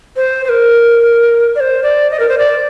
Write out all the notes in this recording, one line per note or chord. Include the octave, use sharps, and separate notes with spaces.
C5
C5
A#4
D5
C5
D5
D#5
A#4
C5
D5